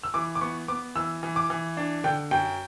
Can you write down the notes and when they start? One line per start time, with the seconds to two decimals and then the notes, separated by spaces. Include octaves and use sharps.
0.03 E6
0.14 E3 D6
0.35 D6
0.41 B3 C#6
0.68 B3 D6
0.95 E3 E6
1.23 E3
1.36 D6
1.50 E3
1.77 D4
2.04 D3 G5
2.31 F#2 G5